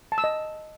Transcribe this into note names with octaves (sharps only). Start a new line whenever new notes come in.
A5
E6
D#5